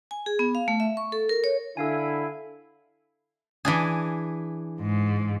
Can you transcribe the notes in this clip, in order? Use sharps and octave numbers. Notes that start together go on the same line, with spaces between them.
G#5
G#4
B3
F5
A3
E5
C#6
A4
A#4
C#5
D3 E4 A4 F5 G#5
E3 D4 G#4
G#2